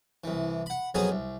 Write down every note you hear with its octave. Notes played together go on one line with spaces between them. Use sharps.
C2 E3
F#5 B5
F2 F#3 B3 G#4 G#5 A#5
C2